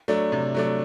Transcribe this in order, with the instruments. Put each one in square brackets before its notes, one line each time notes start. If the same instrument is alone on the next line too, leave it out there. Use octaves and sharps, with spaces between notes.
[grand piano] F#3 A3 D4
C3
F#3 A3 D4